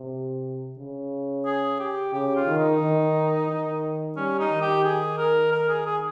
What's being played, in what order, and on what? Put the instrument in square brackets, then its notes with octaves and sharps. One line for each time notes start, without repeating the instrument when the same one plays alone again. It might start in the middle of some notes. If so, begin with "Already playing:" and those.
Already playing: [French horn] C3
C#3
[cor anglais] G#4
G4
[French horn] C#3 [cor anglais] G4
[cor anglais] F4
[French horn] D#3
[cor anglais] D#4
[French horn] D#3
D#3
[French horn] G3 [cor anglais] C#4
[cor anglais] D#4
[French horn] D#3
[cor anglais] G4
G#4
A#4
A#4
G#4
G#4